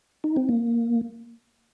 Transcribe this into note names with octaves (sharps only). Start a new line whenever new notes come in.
D#4
C4
A#3